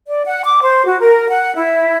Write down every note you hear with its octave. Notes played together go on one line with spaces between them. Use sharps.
D5
F#5
D6
C5
F#4
A#4
F#5
E4